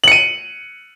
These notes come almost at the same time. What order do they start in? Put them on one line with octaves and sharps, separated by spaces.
F#7 C#7 D#7